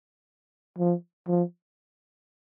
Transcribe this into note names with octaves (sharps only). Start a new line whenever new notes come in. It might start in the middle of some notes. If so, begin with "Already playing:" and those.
F3
F3